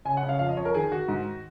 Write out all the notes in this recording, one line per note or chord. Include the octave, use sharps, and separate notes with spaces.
C#3 G#5
F#5
C#3
F5
F2 F5
D#5
F2 C#5
A#4
D#3 G#4
D#3 F#4
G#2